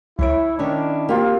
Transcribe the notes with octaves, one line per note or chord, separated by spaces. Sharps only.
C#2 E3 E4 C#5 D7
D#3 C#4 D4 E4
A#3 C4 F4 G4